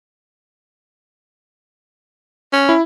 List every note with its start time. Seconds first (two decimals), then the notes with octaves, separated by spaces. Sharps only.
2.53 C#4
2.69 E4